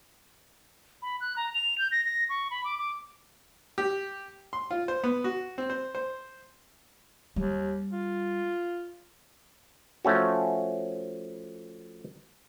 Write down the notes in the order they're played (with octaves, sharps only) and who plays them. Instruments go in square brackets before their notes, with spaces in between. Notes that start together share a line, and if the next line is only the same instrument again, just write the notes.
[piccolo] B5
F#6
A#5
F7
G6
A#6
A#6
C#6
B5
D6
D6
[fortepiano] G4
C6
F4
C5
B3
F#4
C4
C5
C5
[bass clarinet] D#2 [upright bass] G3
[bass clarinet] F4
[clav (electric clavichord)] F3 A3 C#4 F#4